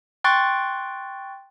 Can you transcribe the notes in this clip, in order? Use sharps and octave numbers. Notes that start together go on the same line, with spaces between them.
G5 C6 C#6 F#6 A6